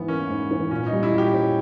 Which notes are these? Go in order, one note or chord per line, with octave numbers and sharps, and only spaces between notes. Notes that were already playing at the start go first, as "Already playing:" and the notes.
Already playing: G#2 E3 B3 E4
A#3 C#4
G#2
E3
A#2 C#4
D#4
G3
E4
A#2
G4
C#4